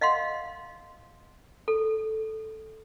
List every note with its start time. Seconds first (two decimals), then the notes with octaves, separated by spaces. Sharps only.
0.01 D#5 F5 F#5 C6
1.68 A4